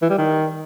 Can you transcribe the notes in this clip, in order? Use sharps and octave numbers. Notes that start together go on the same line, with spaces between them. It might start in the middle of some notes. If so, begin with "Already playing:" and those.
E3
G3
D#3